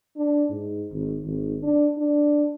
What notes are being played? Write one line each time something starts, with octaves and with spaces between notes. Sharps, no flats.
D4
G#2
G#1
G#1
D4
D4